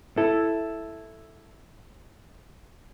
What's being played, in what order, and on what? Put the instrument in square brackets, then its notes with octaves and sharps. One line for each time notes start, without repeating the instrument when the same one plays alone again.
[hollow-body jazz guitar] E4 A4